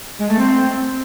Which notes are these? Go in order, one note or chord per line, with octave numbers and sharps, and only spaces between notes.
G#3
A3
C4